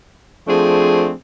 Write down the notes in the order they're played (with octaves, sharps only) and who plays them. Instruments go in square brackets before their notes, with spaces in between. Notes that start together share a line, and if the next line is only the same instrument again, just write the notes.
[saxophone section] F3 A3 C4 D4 G#4